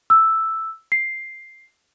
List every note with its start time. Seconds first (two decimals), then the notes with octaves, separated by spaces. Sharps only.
0.10 E6
0.92 C7